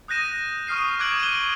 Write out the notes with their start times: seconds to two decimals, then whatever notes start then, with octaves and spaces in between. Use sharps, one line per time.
0.08 D#6 F#6 G6 A#6 D#7 E7
0.67 C#6 D#6 F6 C7 D#7
0.99 C#6 D6 F#6 G#6 D7 F#7
1.19 D#7 G7
1.32 C#6